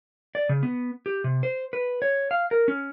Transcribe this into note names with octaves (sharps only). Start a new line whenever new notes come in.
D5
C#3
B3
G4
C3
C5
B4
C#5
F5
A#4
C#4